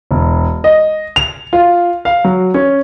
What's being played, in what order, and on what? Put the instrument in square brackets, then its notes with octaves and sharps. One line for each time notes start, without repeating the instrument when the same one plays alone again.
[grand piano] E1
D#5
F7
F4
F5
F#3
C#4